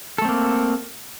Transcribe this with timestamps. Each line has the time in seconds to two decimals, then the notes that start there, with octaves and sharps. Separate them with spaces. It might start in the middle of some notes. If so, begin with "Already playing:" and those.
0.18 A4
0.22 A3
0.25 C4
0.28 A#3